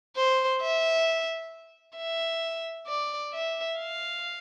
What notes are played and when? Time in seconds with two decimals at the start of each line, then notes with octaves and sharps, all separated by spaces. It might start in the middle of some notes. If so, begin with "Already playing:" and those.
0.16 C5
0.61 E5
1.97 E5
2.87 D5
3.33 E5
3.78 F5